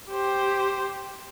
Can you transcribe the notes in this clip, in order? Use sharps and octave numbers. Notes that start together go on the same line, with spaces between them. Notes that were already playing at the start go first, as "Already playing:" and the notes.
G4 C5